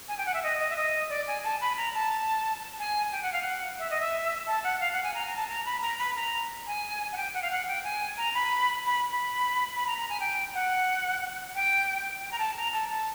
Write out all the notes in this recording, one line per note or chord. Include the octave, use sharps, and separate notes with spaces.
G#5
G5
F#5
E5
D#5
D#5
E5
D#5
D5
G#5
A5
B5
A#5
A5
G#5
G5
F#5
F5
F#5
E5
D#5
E5
A5
F#5
F5
F#5
G#5
A#5
A#5
A5
A#5
B5
A#5
B5
A#5
G#5
F#5
G5
F#5
F5
F#5
G5
G#5
A#5
B5
B5
B5
B5
A#5
A#5
G#5
G5
F#5
G5
G5
A#5
A5
A#5
A5
A5